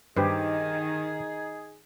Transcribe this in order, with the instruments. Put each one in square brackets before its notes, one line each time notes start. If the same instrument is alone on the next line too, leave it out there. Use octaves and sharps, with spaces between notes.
[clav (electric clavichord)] G2 B4 [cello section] D#3 [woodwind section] D#4 G#4 [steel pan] G4 C5